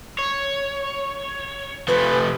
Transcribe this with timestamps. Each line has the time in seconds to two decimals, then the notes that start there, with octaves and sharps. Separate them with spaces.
0.19 C#5
1.88 C3 F3 A3 B4